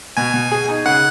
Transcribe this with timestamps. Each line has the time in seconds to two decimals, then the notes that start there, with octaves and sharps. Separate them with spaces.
0.17 B2 G#5
0.34 B2
0.52 G#4
0.69 D#4
0.86 C#3 F#5